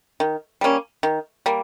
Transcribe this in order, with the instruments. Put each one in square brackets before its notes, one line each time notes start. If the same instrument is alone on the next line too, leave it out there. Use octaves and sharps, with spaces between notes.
[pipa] D#3
G3 A#3 C#4
D#3
G3 A#3